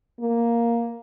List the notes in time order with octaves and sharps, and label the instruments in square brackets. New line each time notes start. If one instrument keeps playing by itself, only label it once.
[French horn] A#3